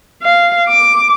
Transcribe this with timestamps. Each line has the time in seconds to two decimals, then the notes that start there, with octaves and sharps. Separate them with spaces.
0.23 F5
0.68 D6